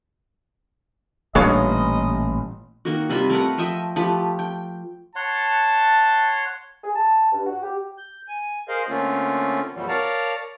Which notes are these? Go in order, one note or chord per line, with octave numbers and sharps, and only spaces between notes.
A1 A#2 G3 D4 F4 C#5 D#5
D#3 A#3 F#4
C3 G3 F4 B5
A3 A#4 B4 F#5
F3 D#5 E5 G5
F3 A3 G4 B4
G5
C#5 F#5 A5 C6
G#4
A5
G2
F#4
G4
G6
G#5
G#4 A#4 C5 D#5 F5
D3 A3 A#3 C4 C#4 F4
F2 A#2 E3 F#3 G3
A#4 C#5 D5 F5 A5 A#5